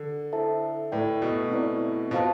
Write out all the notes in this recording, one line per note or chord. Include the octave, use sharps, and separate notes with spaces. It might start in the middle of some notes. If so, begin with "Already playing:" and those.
Already playing: D3
E4 A4 C5 E5 A5
A2 A3 E4 B4 D5 G5
B2
C4 E4 B4 D5
B2 F4 C5 F5 A5